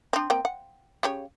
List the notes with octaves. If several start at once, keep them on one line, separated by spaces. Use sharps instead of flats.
C4 D4
A#3 C4 G5
F#5
C#3 G4 C#5